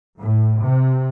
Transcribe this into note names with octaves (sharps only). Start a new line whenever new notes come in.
A2
C3